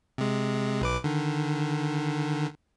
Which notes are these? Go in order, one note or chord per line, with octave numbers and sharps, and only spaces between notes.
C3 G#3
B1 B4 D6
D3 D#3